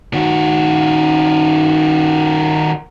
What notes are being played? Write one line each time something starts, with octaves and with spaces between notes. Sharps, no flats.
D#3 F#4